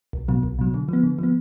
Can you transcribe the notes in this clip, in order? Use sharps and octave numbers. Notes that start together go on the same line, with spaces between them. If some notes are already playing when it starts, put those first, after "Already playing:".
B1
B2 F#3
B1
B2 F#3
D3
F3 B3
D3
F3 B3